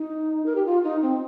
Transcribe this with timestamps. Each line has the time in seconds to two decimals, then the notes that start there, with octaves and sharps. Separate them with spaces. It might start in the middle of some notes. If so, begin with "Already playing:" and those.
Already playing: D#4
0.46 A#4
0.55 G4
0.66 F4
0.84 D#4
1.02 C4